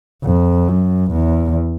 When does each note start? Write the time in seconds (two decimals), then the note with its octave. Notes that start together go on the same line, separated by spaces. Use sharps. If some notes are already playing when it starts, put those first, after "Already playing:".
0.24 F2
0.68 F#2
1.12 E2